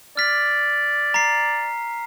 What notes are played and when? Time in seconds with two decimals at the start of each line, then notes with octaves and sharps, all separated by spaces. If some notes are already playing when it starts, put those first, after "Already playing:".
0.17 D5 F6 B6
1.14 A#5 C7